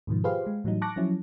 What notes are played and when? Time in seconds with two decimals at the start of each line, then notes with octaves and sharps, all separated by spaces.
0.07 G#2 B2 D#3 F3
0.24 F4 G4 G#4 B4 C5 F5
0.46 G#3
0.64 A2 E3 F#3 G3 D#4
0.82 A5 C#6 D6 F#6 A#6
0.96 F3 F#3 C#4 E4